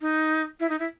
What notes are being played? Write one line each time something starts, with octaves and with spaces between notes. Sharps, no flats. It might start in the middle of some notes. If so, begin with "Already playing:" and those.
D#4
E4
D#4
E4